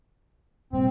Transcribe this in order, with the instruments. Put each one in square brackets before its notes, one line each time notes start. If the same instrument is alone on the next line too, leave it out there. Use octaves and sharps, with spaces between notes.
[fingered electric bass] F1 A#2 G3 [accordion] C4